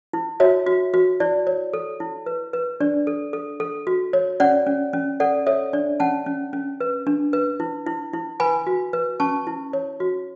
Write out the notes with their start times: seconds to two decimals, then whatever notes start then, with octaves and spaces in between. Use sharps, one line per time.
0.13 E4
0.40 F#4 C#5 E5
0.67 F#4
0.94 F#4
1.20 E4 D5
1.47 C#5
1.73 A4
2.00 E4
2.26 B4
2.53 B4
2.80 D4 D5
3.07 A4
3.33 A4
3.60 A4
3.87 F#4
4.13 C#5
4.40 C#4 D5 F#5
4.67 C#4
4.93 C#4
5.20 A4 D5 F#5
5.46 A4 C#5 E5
5.73 D4 D5
6.00 C#4 F#5 A5
6.26 C#4
6.53 C#4
6.81 B4
7.07 D4
7.33 B4
7.60 E4
7.87 E4
8.13 E4
8.40 B4 G#5 B5
8.67 F#4
8.93 B4
9.20 C#4 A5 C#6
9.47 E4
9.73 C#5
10.00 F#4